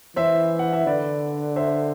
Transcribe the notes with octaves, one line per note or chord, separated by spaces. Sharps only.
E3 C5 E5
F#5
E5
D3 B4 D5
C5 E5